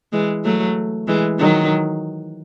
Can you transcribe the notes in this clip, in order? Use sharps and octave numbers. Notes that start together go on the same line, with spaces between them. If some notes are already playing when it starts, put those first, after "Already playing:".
E3 G#3
F#3 A3
E3 G#3
D#3 F#3